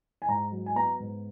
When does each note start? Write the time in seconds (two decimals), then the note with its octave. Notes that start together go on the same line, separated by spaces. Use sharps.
0.22 G#5
0.28 G#2 A#5
0.52 F#3
0.66 G#5
0.76 B3 A#5
1.00 G#2